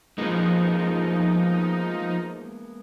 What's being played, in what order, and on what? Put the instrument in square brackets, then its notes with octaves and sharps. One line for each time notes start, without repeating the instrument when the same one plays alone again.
[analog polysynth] F3 D#4 [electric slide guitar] G#3 A#3 B3